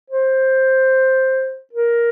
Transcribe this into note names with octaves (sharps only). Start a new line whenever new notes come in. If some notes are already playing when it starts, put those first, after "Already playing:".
C5
A#4